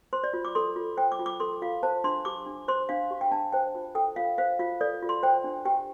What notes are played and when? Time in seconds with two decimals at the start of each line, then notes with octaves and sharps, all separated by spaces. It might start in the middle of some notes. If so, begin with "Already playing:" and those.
0.13 C5 C6
0.24 D5
0.33 F4
0.45 D6
0.55 A4 C6
0.76 F4
0.97 C5 G5
1.12 D6
1.19 F4
1.26 D6
1.40 A4 C6
1.62 F4 F5
1.83 C5 A5
2.04 D4 C6
2.25 G4 D6
2.47 D4
2.68 C5 C6
2.89 D4 F5
3.11 G4
3.21 G5
3.31 D4 A5
3.53 C5 G5
3.75 F4
3.95 A4 G5
4.16 F4 F5
4.38 C5 F5
4.59 F4 F5
4.81 A4 D5
5.02 F4
5.09 C6
5.23 C5 G5
5.44 D4
5.65 G4 G5